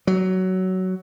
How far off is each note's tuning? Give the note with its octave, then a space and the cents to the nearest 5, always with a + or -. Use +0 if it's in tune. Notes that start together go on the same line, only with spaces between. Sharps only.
F#3 +15